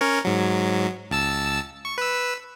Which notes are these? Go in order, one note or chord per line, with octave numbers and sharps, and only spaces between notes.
C#4 A#4 C#5
G#2 F#3
C#2 A5 E6
C#6
B4 E6